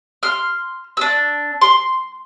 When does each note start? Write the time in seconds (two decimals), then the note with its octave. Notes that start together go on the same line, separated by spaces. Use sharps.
0.23 C6 F6
0.97 D4 E6
1.61 C6